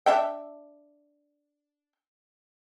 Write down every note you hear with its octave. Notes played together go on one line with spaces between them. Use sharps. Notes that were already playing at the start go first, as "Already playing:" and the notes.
D4 E5 G5